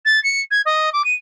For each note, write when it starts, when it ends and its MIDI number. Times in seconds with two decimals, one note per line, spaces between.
0.05 0.22 93
0.24 0.40 97
0.51 0.61 92
0.65 0.90 75
0.93 1.03 86
1.05 1.14 99